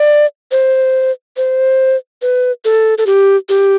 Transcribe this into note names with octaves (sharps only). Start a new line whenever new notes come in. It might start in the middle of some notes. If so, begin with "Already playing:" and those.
Already playing: D5
C5
C5
B4
A4
A4
G4
G4